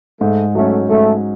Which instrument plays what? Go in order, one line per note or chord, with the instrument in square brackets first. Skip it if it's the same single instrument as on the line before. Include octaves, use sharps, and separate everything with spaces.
[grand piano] G#2 [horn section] A3
[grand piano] F#3 C#4 [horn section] A3
[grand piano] G#2 [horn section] A3